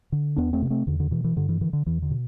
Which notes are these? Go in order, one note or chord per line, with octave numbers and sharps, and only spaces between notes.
D3
E2 B3 D4
A3 C4
C3 B3
A3 C4
E2 D3
D3
B2 E3
E3
G2 D3
E3
D3 E3
D3
E2 E3
D3
B2